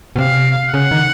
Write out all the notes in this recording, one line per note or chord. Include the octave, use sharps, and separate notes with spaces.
B2
C3 F5
C#3 F#5
D#3